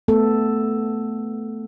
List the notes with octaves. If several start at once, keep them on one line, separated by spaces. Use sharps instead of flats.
A3 B3 A4